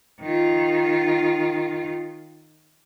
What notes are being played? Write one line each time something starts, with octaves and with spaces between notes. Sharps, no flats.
D#3 F4